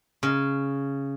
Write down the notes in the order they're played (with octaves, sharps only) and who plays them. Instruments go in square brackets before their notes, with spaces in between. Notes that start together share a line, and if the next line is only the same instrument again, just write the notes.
[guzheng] C#3